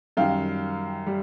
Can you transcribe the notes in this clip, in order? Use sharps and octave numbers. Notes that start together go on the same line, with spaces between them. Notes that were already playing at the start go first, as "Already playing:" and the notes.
F#2 D#3 G3 F5 G5
G3